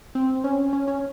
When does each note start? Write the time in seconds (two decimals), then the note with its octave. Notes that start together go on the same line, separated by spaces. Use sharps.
0.15 C4
0.44 C#4
0.73 C#4
0.88 C#4